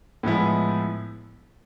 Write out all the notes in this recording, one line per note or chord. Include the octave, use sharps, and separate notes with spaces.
A2 F3 G#3 B3 E4